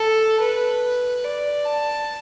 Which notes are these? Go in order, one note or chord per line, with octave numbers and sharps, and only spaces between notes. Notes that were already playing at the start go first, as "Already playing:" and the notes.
Already playing: A4
B4
D5
A5